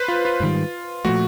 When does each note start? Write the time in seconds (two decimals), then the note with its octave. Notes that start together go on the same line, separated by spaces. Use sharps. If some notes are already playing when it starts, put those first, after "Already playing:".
Already playing: B4 C5
0.08 F4
0.25 F4
0.40 G#2 D#3 G3
1.05 A#2 F3 A3 F#4